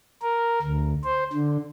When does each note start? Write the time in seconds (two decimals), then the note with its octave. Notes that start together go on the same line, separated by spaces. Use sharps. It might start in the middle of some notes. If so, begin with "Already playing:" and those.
0.23 A#4
0.62 D2
1.04 C5
1.33 D3